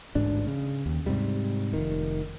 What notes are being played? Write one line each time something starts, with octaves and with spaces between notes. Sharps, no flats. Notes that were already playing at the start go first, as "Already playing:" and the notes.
A1 D2 G#2 D4
C#3
D#2
G#2 C3 G3
F1 D#3